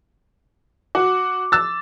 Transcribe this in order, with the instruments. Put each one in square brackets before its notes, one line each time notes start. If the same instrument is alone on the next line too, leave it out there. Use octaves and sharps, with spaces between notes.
[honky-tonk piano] F#4 [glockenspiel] D6
[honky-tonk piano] E6 A6